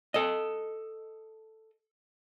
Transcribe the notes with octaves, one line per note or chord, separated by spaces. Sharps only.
A4 D#5